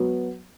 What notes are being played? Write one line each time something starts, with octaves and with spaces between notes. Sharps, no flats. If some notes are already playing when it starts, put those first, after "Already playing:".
Already playing: F#3 B3